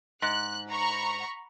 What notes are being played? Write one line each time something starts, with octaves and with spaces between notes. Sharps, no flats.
G#2 F#6
A#5 B5 C#6